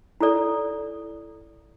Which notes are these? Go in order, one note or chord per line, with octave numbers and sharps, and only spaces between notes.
E4 A4 D5